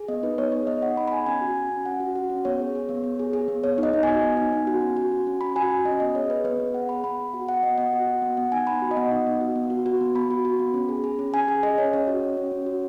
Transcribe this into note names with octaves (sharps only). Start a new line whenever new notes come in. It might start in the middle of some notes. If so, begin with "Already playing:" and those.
Already playing: G#4
B3 D#5
D#4 B4
B3 C#5
G#4 C#5
B3 D#5
D#4 F#5
B3 B5
B5
G#4 G#5
C#4 G#5
F#4
F#4
C#4
C#4 F#5
F#4
F#4
C#4
B3 C#5
G#4
G#4
B3
B3
G#4
G#4
B3
B3 C#5
D#4
D#5
B3
G#5
F#4
B3
D#4
B3
F#4
C#4
F#4
F#4
C#4
C#4 B5
F#4 G#5
F#4
C#4 D#5
B3 D#5
G#4 C#5
G#4 B4
B3 B4
B3
G#4 F#5
G#4 B5
B3 B5
B3
F#4 F#5
F#4 F#5
B3 D#5
B3 F#5
F#4
F#4
B3
B3 F#5
D#4 G#5
B3 B5
F#4
D#5
B3 F#5
D#4
B3
F#4
B3
F#4
F#4
B3
B3 B5
F#4
F#4
B3
C#4
G#4
G#4
C#4
C#4 G#5
G#4 G#5
G#4 D#5
C#4 C#5
C#4 C#5
F#4
F#4
C#4
C#4
F#4